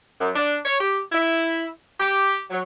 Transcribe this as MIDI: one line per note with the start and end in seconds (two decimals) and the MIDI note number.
0.20 0.30 42
0.36 0.57 62
0.66 0.79 73
0.81 1.00 67
1.12 1.67 64
1.99 2.41 67
2.51 2.61 54